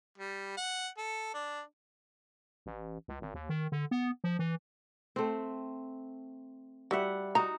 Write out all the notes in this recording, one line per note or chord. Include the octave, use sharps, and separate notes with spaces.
G3
F#5
A4
D4
A1
C#2
G#1
D#2
D#3
D3
B3
F3
E3
A3 C4
G3 F#4 E5 F#5
D#4 F#4 A#5